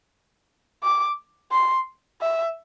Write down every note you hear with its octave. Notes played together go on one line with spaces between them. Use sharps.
D6
C6
E5